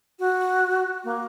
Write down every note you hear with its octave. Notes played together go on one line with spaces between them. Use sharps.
F#4
A#3